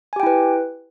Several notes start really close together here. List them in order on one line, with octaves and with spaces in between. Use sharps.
G#5 G4 G5 E4 B4